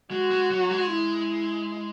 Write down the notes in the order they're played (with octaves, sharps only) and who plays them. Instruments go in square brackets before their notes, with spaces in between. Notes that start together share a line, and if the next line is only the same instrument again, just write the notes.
[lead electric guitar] G#3 [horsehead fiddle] F#4
[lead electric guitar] G#3
F#3
G#3
[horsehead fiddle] E4